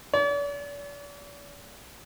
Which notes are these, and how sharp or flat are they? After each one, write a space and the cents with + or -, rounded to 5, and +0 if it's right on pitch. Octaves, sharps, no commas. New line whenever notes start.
D5 -45